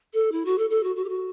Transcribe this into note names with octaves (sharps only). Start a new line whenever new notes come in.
A4
E4
F#4
A4
A4
F#4
F#4
G4
F#4